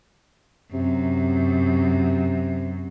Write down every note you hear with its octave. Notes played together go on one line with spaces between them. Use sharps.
F#2 C3